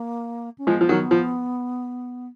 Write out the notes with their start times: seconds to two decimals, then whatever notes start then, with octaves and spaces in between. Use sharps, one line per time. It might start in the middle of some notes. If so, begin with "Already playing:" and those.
Already playing: A#3
0.58 C#4
0.67 F3 G#3 B3
0.81 F3
0.89 D#3 F#3
1.11 F3